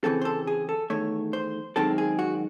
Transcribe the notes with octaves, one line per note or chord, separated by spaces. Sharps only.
C#3 E3 C4 A4
C5
A4
G#4
A4
E2 D#3 A3 C#5
C5
F#2 D#3 G#3 C4 A4
G#4
F#4